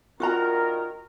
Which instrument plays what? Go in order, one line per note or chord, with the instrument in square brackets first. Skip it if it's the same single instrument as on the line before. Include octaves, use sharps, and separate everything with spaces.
[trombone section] A#1 D#3 A#4 [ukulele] F4 F#4 A#5